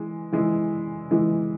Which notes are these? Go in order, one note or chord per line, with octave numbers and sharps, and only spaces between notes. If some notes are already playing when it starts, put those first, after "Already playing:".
Already playing: E3 G#3
E3 G#3 E4
E3 G#3 E4